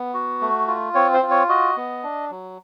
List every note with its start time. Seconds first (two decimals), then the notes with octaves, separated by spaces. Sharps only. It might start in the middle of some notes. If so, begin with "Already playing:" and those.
Already playing: B3
0.14 F#4
0.41 A3
0.68 F4
0.95 C4 C#5
1.14 C5
1.23 F4
1.31 C#5
1.49 F#4 D#5
1.77 B3
2.03 D4
2.30 F#3